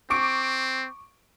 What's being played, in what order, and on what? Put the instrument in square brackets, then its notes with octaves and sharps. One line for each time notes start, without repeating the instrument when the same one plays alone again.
[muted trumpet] C4 [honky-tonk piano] C#6 D6 D7